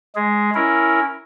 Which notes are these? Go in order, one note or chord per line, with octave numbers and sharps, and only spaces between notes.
G#3 G#4
C#4 E4 A#4